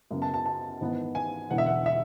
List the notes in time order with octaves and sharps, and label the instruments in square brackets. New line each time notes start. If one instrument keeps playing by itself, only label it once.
[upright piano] F#2 C#3 F#3 B3
A5
A5
A5
G#1 G#2 E3 B3
G#5
E1 E2 D3 F#5
E5
F#5
E5